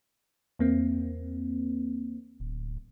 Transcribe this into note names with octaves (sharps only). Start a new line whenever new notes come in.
E2 A#3 C4
D1